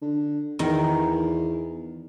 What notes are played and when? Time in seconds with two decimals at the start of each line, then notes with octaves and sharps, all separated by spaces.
0.01 D3
0.59 E2 D#3